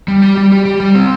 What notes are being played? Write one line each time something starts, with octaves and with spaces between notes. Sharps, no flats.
G3
G4
G3
G4
G4
G3
C4